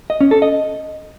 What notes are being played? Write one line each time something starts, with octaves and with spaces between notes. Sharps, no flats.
D#5
C#4
A4
D#5